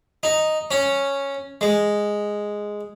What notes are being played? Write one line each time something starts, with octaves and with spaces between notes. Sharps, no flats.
D#4
C#4
G#3